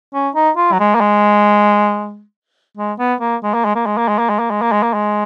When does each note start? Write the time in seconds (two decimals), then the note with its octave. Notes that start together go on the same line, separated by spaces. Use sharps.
0.14 C#4
0.35 D#4
0.57 F4
0.72 F#3
0.80 G#3
0.95 A#3
1.01 G#3
2.77 G#3
2.99 B3
3.21 A#3
3.43 G#3
3.54 A#3
3.65 G#3
3.75 A#3
3.86 G#3
3.97 A#3
4.08 G#3
4.18 A#3
4.29 G#3
4.39 A#3
4.51 G#3
4.61 A#3
4.72 G#3
4.83 A#3
4.94 G#3